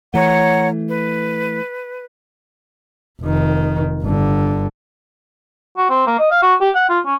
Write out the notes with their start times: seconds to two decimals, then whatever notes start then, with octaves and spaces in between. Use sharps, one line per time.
0.14 E3 A3 C#5 F#5 A#5
0.88 B4
3.21 F1 D#3
4.02 G1 D3
5.77 F#4
5.89 C4
6.07 A#3
6.19 D#5
6.30 F5
6.42 F#4
6.61 G4
6.75 F#5
6.89 F4
7.05 C#4